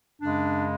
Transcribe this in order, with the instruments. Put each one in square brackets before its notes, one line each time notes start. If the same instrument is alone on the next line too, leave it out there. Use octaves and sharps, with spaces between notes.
[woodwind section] F#2 C#3 G#3 D4